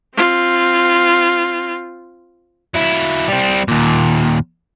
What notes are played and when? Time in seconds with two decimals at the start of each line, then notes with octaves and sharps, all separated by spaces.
0.16 C4 F4
2.74 F#3 E4
3.28 G3 C4
3.68 D#2 A#2